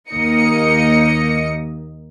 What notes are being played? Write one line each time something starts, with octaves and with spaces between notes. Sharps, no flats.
D#2 A#3 D#4 D#5 C#7